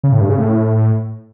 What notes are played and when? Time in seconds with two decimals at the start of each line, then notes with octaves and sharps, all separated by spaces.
0.04 C#3
0.12 A2
0.21 G2
0.30 C#3
0.38 A2